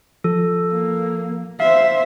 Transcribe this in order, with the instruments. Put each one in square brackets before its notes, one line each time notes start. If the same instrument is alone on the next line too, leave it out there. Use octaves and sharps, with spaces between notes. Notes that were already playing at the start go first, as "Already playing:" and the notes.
[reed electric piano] F3 [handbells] A4
[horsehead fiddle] A#3
[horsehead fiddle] C5 E5 [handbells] F5